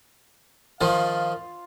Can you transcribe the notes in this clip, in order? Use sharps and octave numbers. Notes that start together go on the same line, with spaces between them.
D#3 F3 F4 F5